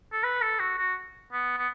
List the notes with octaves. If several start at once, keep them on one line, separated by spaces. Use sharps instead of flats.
A4
B4
A4
F#4
F#4
B3
B3